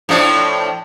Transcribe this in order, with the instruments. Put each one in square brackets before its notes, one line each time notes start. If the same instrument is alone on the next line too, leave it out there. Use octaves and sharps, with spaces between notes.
[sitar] A2 F3 D4